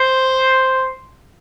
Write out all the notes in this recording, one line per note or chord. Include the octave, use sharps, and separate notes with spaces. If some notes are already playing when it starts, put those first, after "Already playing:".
Already playing: C5